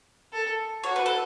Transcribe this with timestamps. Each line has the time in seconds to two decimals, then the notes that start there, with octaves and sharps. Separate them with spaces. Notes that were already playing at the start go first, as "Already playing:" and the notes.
0.33 A4
0.84 F#4 C#5
0.96 B4
1.06 A4